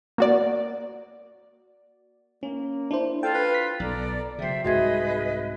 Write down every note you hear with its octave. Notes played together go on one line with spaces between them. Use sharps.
A#3 F#4 D5
A#3 C#4
D4 E4 C5
F4 A4 G5
B4
B6
B1 A4 D5 A#5
C#3 F#3 C5 E5 G5
C2 G#2 F#4 G#4 B4 D#5 E5 G#6